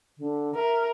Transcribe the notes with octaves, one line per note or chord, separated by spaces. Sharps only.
D3
A#4 E5